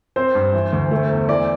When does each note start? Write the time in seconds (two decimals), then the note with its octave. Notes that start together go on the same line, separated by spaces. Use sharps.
0.16 C4 C5
0.35 G2
0.53 E3
0.73 D2
0.91 A3
1.10 E2
1.29 E3 D5